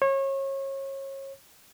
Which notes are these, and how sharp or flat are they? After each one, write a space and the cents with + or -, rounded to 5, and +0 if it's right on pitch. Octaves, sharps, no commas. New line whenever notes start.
C#5 -30